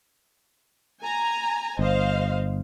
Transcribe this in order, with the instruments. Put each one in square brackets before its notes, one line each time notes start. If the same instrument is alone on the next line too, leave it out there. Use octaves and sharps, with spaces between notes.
[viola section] G#5 A#5
[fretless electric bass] G1 [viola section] C5 D#5 F5